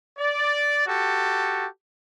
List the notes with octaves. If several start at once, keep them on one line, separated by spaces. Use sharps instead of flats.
D5
F#4 G4 A4